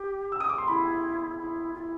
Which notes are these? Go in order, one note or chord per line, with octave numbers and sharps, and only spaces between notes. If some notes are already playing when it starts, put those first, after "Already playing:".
Already playing: G4
E6
D#6
D6
C6
E4 B5
E4
F4
E4